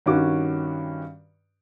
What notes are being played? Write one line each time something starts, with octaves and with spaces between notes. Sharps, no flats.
G2 D#3 C#4 F#4 D6